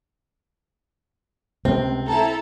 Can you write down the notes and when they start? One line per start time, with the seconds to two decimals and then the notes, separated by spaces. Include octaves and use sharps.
1.65 C#2 C3 C4
2.08 E4 A4 A5 A#5